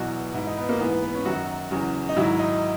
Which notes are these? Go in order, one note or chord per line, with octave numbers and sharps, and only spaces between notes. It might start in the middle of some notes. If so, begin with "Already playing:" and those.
Already playing: E2 B2 F#3 F#4
G#2 E3 E4
D#4
B3
A#3
G#2 E3 B3
B3
B3
C#4
F#2 D#3 F#3 F#4
E2 C#3 F#3
D#4
G#2 D#3 F#3 E4
D#4